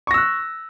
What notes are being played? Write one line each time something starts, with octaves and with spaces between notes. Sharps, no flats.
C#6 E6 F#6 A#6